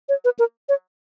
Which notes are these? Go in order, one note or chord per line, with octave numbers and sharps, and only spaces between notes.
C#5
B4
A#4
C#5